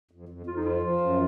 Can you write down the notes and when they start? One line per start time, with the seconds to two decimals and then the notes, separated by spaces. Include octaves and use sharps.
0.11 F2
0.29 F2
0.46 F2 F4
0.56 D#4
0.65 F3 F4
0.82 F3
1.01 F#2